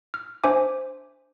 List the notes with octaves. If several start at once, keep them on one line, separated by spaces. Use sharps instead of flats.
F6
D4 C5 E5 G#5 D6